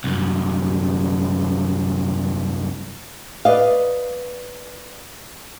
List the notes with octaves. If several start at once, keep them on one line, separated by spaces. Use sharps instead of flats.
C2 F#2
B4 D5 D#5 F5